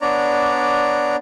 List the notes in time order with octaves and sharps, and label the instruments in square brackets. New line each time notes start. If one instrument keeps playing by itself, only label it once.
[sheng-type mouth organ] B3 D4 C#5 D5 A#5